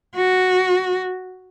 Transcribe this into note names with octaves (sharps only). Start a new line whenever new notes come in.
F#4